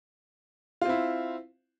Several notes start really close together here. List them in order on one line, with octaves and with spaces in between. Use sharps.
F4 C4 E4